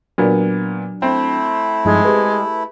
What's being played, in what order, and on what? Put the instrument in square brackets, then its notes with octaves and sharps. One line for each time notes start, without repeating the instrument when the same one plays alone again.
[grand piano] A#2 A#3 B3 [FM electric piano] F#3 D4
[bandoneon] A3 E4 [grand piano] C4
[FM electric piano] G2 F3 D#4 [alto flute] G#3
[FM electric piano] G4 G#4 B4